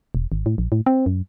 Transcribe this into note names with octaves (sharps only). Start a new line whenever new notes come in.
E1
G#1
A2
A#1
A2
C4
F#2